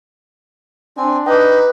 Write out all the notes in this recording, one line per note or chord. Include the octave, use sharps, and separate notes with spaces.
C4 D4 G#5
D#4 B4 D#5 G5 D6